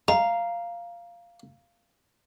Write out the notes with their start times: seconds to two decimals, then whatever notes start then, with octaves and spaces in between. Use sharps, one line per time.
0.08 G#3 F5 A#5